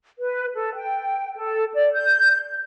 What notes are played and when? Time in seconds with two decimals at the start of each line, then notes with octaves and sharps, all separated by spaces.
0.20 B4
0.53 A4
0.76 G5
1.36 A4
1.75 D5
1.94 G6